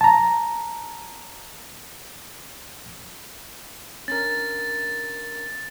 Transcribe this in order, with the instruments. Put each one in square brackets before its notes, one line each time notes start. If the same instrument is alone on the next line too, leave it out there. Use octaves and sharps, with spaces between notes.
[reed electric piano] A5 A#5
[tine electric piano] C#4 D4 A#4 [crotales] A6